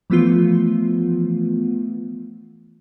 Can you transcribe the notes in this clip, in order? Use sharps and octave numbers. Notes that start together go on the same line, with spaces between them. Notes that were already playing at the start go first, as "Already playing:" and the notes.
E3 F3 A3 B3 F4